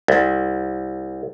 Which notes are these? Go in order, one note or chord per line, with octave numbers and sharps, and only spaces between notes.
C2